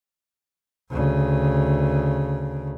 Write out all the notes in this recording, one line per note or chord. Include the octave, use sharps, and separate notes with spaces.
D2 C#3